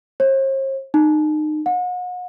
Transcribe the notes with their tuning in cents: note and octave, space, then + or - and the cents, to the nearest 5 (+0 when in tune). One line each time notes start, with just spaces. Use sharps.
C5 +45
D#4 -30
F#5 -40